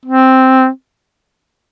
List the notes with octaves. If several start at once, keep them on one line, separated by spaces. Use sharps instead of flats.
C4